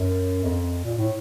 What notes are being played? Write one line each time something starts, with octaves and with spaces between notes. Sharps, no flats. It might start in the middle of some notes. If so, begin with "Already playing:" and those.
Already playing: F#2
F2
A#2
A2